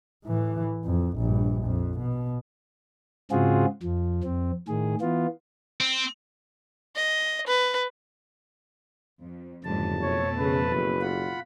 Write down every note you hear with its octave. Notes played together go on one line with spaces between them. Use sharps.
A2 E3
F2
A#1 G2
F2
B2
G#2 C#3 C4 F4 F#4 G#4
F2 F3
F2 C4
A2 D#3 G#4
E3 B3 F4
C4
D#5
B4
F2
F#1 F2 G#2 D3 A5
B2 F3 A3 C#5
C#3 B4
F#1
F4 F#5 B5